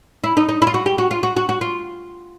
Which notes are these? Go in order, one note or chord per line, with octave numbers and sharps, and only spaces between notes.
E4
D#4
D#4
E4
F4
F#4
G4
F#4
F4
F#4
F#4
F#4
F4